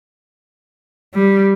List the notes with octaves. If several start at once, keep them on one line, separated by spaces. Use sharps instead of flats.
G3